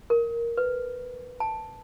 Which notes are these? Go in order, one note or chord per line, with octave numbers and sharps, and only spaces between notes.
A#4
B4
A5